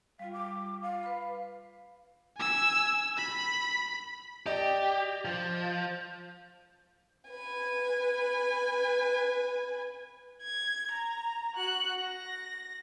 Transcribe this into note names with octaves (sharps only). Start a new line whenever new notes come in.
G3 F4 F5
D6
F5
B4 B5
G#5 E6
B5
G4 D5 D#5
F3
B4 G#5
G#6
A#5
F#4 F#6
A#6